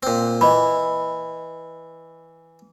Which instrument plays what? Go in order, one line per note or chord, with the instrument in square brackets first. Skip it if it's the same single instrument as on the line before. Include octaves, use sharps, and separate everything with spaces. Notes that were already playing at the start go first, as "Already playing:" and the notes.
[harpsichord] A#2 C4
[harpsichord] E3 [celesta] D#5 B5